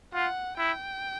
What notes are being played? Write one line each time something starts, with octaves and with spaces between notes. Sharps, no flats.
F4 F#5
E4 G5